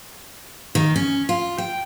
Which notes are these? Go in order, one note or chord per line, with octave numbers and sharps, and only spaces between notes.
D#3
C#4
F4
G5